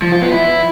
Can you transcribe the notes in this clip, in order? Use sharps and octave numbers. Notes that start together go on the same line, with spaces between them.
F3
F4
B3
E4